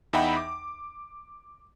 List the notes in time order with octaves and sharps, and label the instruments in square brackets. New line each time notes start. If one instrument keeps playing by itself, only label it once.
[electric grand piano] E2 D#4 E5 F#5 G5 B5
D6